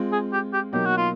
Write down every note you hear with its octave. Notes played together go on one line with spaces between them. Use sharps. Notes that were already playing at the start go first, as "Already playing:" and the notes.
Already playing: G#3 C4 F4
G#4
G4
G4
B2 F#3 A#3 D#4 G4
F#4
F4